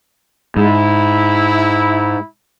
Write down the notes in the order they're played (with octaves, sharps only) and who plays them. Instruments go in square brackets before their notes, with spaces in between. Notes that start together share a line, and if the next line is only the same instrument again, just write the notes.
[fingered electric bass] G#2 [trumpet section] E4